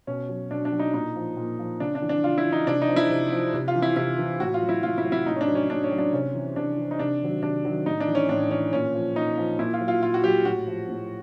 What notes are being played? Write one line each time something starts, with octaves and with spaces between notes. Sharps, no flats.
B2 C#4
F#3
B2 D4
D4
F#3
D#4
A#2 D#4
F3
A#2
F3
C#3 D4
D4
E3
D4
C#3 F4
E4
E3
D#4
C3 D4
D#4
F3
E4
C3
F3
C3
F4
E3
E4
C3 E4
E3
A2 F#4
F4
F#3
E4
A2 F4
E4
F#3
E4
A2 D#4
C#4
D4
F#3
C#4
A2 D4
C#4
F#3
D4
C3 C#4
E3
C3 D4
E3
D#4
C3 D4
D#3 F#3
C3 D4
D#3 F#3
A2 D#4
D4
E3
C#4
A2 D4
E3 C#4
A#2 C#4
F3
A#2 D#4
F3
A#2 E4
F4
F#3
F4
A#2 F4
F#4
F#3 G4
A2 F#4
F3
A2